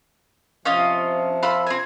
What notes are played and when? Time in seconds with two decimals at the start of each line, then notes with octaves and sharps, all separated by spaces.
0.65 C3 F3 C#4 F4 D#5
1.43 F4 B5 E6
1.67 C4 G#5